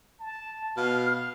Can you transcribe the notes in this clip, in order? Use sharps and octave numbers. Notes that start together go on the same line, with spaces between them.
A5
B2 F5 F6